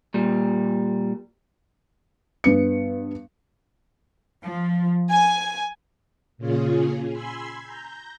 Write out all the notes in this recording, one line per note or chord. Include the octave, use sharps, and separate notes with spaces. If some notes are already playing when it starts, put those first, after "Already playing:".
A#2 G3
G2 B3 C#7
F3
G#5
A#2 C#3 C#4 F4 G#4
G#5 B5 C6 E6 G#6
A#5 G6